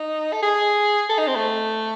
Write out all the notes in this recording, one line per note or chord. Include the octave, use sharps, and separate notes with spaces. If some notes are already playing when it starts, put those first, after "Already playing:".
Already playing: D#4
A4
G#4
A4
D#4
C4
A3